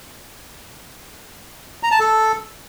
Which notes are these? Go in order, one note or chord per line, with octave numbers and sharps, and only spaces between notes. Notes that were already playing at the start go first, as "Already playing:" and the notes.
A#5
A5
A4